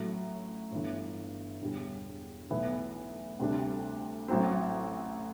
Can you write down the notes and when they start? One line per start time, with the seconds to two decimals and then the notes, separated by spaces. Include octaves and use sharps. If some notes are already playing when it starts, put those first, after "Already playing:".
Already playing: A1 A2 F#3 A3
0.71 G1 G2 E3
1.61 E1 E2 D3 G3
2.50 B1 A2 E3 B3 E4
3.39 D2 C3 G3 D4
4.28 A1 A2 F#3 C4